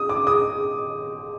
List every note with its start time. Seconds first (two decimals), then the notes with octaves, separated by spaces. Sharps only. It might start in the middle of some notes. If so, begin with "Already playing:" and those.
Already playing: D#6
0.09 D6
0.27 D#6